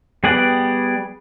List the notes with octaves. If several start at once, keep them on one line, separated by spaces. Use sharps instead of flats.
G3 B3 G#4 D5 F#5